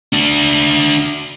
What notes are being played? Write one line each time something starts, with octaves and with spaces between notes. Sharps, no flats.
D4 F#4